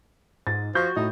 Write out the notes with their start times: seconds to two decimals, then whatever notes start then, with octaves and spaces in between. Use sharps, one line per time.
0.47 G#2 A6
0.75 F3 F#4 G6
0.96 A2 D#4